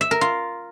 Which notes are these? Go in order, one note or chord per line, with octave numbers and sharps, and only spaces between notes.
E5
A#4
F4